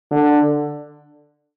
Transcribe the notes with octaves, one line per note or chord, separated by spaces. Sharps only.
D3